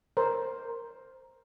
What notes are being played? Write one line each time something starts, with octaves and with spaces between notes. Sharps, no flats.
A#4 C5